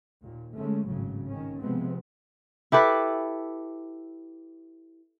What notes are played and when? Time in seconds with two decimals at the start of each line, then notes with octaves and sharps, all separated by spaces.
0.21 D#2 A#2
0.56 D3 G#3 A3 C#4
0.87 G#1 A2 C#3 F#3
1.28 D#3 C#4
1.60 C3 F3 G#3 B3 C4
2.72 E4 G4 A4 B4